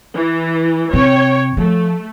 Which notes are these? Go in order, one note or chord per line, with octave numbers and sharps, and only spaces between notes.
E3
C3 C#5 G5
F3 A3